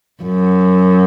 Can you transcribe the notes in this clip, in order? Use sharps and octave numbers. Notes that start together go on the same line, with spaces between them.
F#2